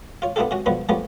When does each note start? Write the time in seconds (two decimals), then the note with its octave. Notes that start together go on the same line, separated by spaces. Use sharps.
0.22 F4 C#5
0.36 B3 D4 E4 F4 G4 A4
0.51 C3 C#4 F#4
0.66 B2 D3 F3 G3 B3
0.89 F3 A3 B3 C#4 G4